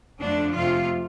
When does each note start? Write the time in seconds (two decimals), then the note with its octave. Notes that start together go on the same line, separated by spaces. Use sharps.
0.21 F2 D3 F3 A3 D4
0.54 F2 C3 A3 F4